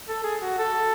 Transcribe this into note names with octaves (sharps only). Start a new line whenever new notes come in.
A4
G#4
F#4
A4